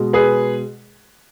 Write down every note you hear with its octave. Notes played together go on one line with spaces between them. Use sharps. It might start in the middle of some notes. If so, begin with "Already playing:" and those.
Already playing: B2 G#3
G#4 B4